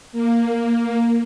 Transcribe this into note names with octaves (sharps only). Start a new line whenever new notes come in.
A#3